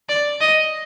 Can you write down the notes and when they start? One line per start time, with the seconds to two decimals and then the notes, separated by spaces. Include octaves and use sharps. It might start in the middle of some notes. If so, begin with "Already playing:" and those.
0.09 D5
0.41 D#5